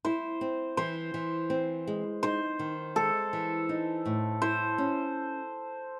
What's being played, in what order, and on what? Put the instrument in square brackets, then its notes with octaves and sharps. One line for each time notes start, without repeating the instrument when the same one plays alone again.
[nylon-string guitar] E4 [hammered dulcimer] C5
[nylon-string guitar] C4
[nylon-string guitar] E3 [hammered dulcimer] C5
[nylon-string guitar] E3
C4
G#3
[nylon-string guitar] D#4 [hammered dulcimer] C5
[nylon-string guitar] D#3
[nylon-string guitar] G#3 [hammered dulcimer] A4
[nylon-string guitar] E3
D#4
A2
[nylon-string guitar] E4 [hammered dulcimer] C5
[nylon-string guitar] C#4